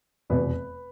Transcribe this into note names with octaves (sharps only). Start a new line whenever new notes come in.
F1 E2 B2 B4